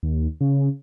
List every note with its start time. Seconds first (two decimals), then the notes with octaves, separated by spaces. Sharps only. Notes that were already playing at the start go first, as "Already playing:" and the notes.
0.03 D#2
0.41 C#3